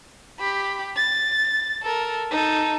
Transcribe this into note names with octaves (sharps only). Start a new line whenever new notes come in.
G4 B5
A6
A4 A#4
D#4 A4